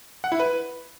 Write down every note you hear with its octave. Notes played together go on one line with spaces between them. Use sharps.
F#5
E4
B4